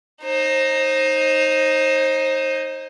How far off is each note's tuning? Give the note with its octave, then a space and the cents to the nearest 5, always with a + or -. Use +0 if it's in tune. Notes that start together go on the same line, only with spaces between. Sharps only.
D#4 +0 C5 +30